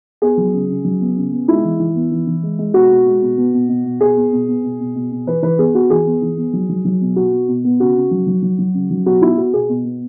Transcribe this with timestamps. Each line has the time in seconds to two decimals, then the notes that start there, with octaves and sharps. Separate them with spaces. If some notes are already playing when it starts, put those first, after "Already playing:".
0.22 B3 G#4
0.38 F#3
0.54 C#3
0.69 C#3
0.85 F#3
1.01 B3
1.17 C#3
1.32 B3
1.48 G#3 E4
1.64 E3
1.80 E3
1.95 B3
2.11 E3
2.27 E3
2.43 G#3
2.59 G#3
2.74 B2 F#4
2.90 B2
3.06 G#3
3.22 B2
3.37 B3
3.54 B2
3.69 B2
3.85 B2
4.01 B2 G#4
4.17 B3
4.32 B2
4.48 B3
4.64 B2
4.80 B2
4.95 B2
5.12 B2
5.27 E3 B4
5.42 E3 B4
5.59 B3 G#4
5.75 B3 F#4
5.90 E3 G#4
6.07 B3
6.22 E3
6.37 B3
6.53 F#3
6.69 F#3
6.85 F#3
7.01 B2
7.16 B2 F#4
7.32 B3
7.48 B2
7.64 B3
7.80 C#3 F#4
7.96 C#3
8.11 F#3
8.27 F#3
8.43 F#3
8.59 F#3
8.74 C#3
8.90 F#3
9.06 B2 F#4
9.22 B3 E4
9.38 B3 F#4
9.53 B2 G#4
9.69 B2
9.85 B3